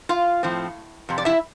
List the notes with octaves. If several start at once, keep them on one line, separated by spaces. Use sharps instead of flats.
F4 F5
A2 F3 C4
F2 C3
D5
E4 E5